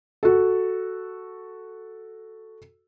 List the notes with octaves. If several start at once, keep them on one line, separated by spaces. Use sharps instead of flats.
F#4 A4